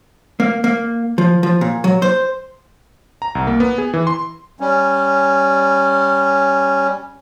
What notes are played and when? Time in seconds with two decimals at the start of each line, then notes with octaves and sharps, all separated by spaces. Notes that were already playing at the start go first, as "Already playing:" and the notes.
0.40 A#3
0.64 A#3
1.18 F3
1.43 F3
1.61 A#2
1.84 F#3
2.02 C5
3.22 A#5
3.35 C2
3.47 A#3
3.60 B3
3.78 G#4
3.93 E3
4.07 C6
4.60 G3 C#4